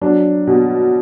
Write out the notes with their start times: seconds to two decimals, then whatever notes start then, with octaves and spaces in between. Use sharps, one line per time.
0.01 F#3 D4
0.47 B2